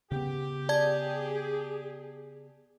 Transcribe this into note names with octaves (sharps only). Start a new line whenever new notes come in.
C#3 B3 G4
G#4 D5 A5 G#6